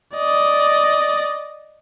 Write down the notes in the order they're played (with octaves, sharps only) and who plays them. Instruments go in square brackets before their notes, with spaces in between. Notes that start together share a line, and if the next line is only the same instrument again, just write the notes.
[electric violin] D5 D#5